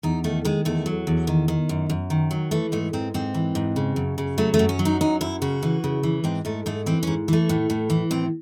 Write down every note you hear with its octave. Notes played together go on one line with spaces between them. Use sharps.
E2 D#4
D#3 A3
D#3 G#3
E2 A3
F#3
E2
D#3
D#3
F#2
F#2
D#3
F#3
E3 A3
G#2 A3
G#2 C4
G#2 C4
E3
G#2
C#3
F#2
C#3
F#3 A3
A3
F#2
C#4
F#3
D#4
F#2 D#4
F#2 E4
C#3 F#4
E3
C#3
E3
G#2 C4
G#2 A3
G#2 A3
E3 C4
G#2 C#4
E3 A3
A2
A2
E3
A2 C4